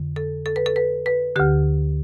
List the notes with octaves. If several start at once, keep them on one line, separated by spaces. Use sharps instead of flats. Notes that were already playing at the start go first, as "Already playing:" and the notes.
Already playing: F2 D3
A4
A4
B4
A4
B4
B4
D2 D3 G4